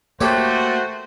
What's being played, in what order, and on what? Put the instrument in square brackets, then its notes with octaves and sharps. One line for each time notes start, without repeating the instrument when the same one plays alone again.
[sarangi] A3 [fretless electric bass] A#3 [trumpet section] F#4 C5 [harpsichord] G4 A4 C#5